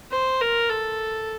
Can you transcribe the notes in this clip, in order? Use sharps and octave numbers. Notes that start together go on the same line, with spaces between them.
C5
A#4
A4